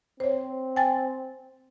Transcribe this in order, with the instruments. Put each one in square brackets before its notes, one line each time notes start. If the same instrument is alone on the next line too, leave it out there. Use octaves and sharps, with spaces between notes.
[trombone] C4 [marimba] C5 C#5
[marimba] G5 G#5 A6